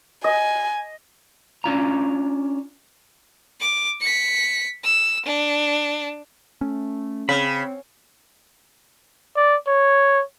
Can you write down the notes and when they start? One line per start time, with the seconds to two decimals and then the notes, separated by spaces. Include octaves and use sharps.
0.24 D#5 G#5
1.64 C#4 D4 F4 A#5
3.60 D6
4.01 B6 C#7
4.83 E6
5.25 D4
6.61 A3 C#4
7.29 C#3 C4 B5
9.36 D5
9.68 C#5